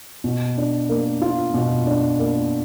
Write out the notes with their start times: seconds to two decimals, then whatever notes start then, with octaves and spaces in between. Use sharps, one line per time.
0.24 B2
0.57 D4
0.89 A#3
1.22 F4
1.54 B2
1.86 D4
2.19 A#3